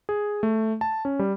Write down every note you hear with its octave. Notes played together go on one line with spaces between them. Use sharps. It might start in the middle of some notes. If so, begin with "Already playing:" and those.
G#4
A3
A5
C#4
G3